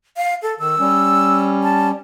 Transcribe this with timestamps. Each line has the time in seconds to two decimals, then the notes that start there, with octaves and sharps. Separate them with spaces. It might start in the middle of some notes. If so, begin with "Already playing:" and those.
0.17 F5
0.42 A4
0.59 D#3 E6
0.79 G3 C#4
1.63 A5